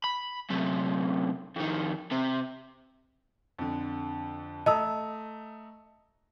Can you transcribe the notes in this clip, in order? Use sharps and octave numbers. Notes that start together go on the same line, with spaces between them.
B5
F#2 C3
F2 D#3
C3
F2 D3
A3 D#5 A5 A#5 D#6 E6